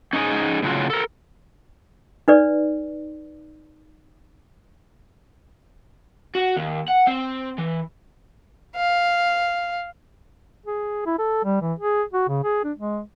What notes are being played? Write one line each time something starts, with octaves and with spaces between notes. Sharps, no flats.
C#4 D#4 F#4 G#4
A2 C#3 F#3 F4
A4 A#4
D#4 B4 D5
F#4
D#2
F#5
C4
E3
F5
G#4
E4
A4
G3
E3
G#4
F#4
C#3
G#4
D4
G#3